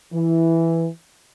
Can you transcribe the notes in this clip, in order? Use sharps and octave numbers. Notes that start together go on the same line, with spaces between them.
E3